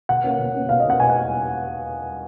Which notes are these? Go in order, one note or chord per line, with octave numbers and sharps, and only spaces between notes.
B2 F#5
A#3 C#4
B2
A#3 C#4
B2 F5
D#5
A#3 C#4 F#5
B2 G#5
F#5